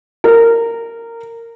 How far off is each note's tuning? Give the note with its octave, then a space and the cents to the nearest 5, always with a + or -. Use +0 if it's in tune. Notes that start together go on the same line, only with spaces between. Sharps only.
A#4 -15